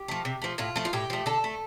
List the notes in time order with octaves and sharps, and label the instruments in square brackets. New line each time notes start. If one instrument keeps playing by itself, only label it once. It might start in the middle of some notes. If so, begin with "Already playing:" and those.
Already playing: [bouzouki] G4
F3 A3
C3
F3 A3
A2 F4
F3 A3
F4
A2 G4
F3 A3
D3 A4
A3